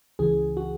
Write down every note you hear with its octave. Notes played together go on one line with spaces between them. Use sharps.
C#2 C#3 E3 G#4
F#4